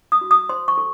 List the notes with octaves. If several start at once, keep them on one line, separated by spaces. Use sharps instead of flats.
D#6
F#4
D#6
C5 C6
C#6
A4